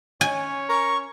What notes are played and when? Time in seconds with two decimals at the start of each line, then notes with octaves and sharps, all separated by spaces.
0.21 C#4 C#5 G#5
0.69 A#4 C#6